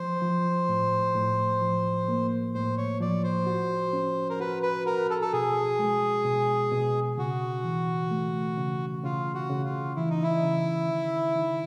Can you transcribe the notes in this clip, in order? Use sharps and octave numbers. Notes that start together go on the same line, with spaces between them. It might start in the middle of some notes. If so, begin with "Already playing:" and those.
Already playing: F3 C5
F3
A2
A2
F3
A#3
A2 C5
C#5
F3 D5
C5
F#4
C#4
A#4
F#4 B4
B4
F#4 A#4
A4
A4
B2 G#4
G#3
B2
B2
C#3 F#4
E3
A3
C#3
C#3 F4
F#4
C#3
F4
E3 E4
D#4
E4
C#3
D#3
D#3